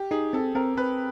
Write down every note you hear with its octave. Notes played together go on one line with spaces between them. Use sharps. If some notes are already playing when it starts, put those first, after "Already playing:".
Already playing: G4
D#4 G#4
C4 A4
C4 A#4
C4 B4